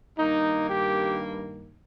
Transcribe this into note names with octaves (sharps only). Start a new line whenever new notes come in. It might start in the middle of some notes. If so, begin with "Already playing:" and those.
G2 D#3 A#3 D#4
G4